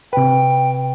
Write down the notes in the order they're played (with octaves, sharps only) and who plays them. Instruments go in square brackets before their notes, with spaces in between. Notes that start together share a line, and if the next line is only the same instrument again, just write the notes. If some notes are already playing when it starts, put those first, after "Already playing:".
[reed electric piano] C3 B4 [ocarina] G5